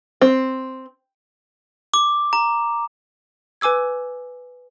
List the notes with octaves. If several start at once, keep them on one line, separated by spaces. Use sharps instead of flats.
C4
D6
A#5
B4 G#5 D6 E6 G#6